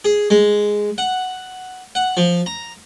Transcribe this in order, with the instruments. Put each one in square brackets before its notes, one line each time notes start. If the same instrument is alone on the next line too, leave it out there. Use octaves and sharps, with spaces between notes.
[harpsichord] G#4
G#3
F#5
F#5
F3
A#5